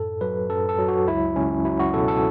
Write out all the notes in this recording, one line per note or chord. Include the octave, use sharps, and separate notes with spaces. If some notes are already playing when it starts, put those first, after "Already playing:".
Already playing: F#2 A2 A4
F#3 B4
F#2 A4
A4
F#3
F#4
C#2 E4
C#2 C#4
F#3 E4
F#4
B2 A4
A4